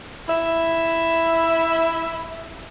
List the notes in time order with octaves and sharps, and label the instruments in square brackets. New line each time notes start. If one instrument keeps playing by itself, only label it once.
[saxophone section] E4 E5